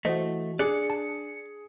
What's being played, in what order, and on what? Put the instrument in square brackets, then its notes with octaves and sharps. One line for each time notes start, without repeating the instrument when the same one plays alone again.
[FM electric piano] E3 F#4 [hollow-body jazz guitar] A3 [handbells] C5 D#5
[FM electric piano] D4 C#7 [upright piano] G#4 [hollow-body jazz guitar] D5 [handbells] F#6
[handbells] A5